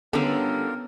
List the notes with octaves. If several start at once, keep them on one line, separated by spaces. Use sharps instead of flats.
D3 G3 B3 C#4 F4 A4 A#4